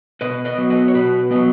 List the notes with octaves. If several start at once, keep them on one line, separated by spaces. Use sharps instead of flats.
B2 B4 D#5
B4 D#5
F#3 B3
B4 D#5
C#5
B2 F#4 B4
F#3 B3 B4 D#5